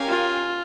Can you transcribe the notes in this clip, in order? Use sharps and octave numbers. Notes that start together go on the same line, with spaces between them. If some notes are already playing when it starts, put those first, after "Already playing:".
Already playing: C#4 G4 A#4 F5 G#5
F4